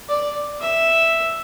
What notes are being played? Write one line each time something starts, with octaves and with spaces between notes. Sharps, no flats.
D5
E5